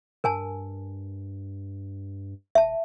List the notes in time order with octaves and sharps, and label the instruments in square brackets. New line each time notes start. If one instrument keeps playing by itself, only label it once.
[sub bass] G2 [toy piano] A#4 G#5 A5
[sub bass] D#1 [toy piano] E5 A5